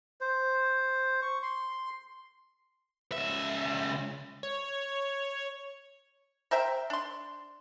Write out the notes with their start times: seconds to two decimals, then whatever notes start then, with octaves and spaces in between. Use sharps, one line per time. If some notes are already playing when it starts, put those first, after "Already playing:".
0.21 C5
1.22 C#6
1.43 C6
3.12 C#2 E5
4.43 C#5
6.51 A#4 C5 E5 G5
6.90 D4 C6